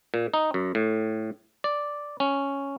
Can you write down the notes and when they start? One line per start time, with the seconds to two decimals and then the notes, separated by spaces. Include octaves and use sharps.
0.14 A#2
0.34 D#4
0.54 F#2
0.75 A2
1.64 D5
2.20 C#4